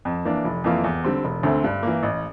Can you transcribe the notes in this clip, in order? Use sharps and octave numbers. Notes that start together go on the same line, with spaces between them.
F2
E3 A#3 D4
F1
F2 E3 A#3 F4
E2
D3 G3 C4
E1
D2 D3 A3 C4
G2
E3 A#3
A1